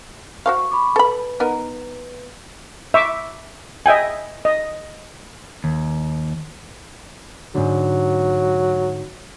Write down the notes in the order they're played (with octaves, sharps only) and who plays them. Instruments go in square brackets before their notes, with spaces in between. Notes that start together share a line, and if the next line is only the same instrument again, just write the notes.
[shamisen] F#4 C5 F5 [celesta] C#6
[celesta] B5 C#6 D6
[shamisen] A4 B5 [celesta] B4
[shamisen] B3 D#4 A#4
[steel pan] E5 C#6 D6
D#5 E5 G5 G#5
D#5
[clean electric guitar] D#2
[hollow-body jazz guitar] G#2 D3 [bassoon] F#3